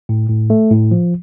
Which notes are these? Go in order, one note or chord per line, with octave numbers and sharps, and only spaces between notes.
A2
A2
A3
A2
F3